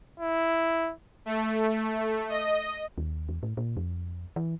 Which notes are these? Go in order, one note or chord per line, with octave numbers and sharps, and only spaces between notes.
E4
A3
D#5
D#2
E2
A2
A#2
F2
E3